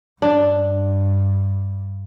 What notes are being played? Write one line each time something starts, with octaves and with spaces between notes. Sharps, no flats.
G2 D4